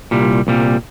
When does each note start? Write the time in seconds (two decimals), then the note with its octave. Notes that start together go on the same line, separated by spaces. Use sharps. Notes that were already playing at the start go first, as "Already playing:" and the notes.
0.11 C2 A#2 G3
0.47 C2 A#2 G3